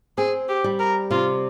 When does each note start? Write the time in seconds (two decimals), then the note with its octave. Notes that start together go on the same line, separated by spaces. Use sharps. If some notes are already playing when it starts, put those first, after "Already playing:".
0.18 C4 G#4
0.49 G4
0.64 G3
0.79 A#4
1.11 C3 F4